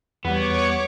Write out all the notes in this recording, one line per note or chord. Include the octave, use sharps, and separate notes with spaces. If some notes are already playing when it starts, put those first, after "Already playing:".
E2 G3 B3 C#5 C#6 D6